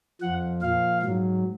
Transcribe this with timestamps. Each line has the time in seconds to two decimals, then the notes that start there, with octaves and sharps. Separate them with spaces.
0.21 F2 F3 F#5
0.62 A#2 F3 F5
1.03 G#2 F#3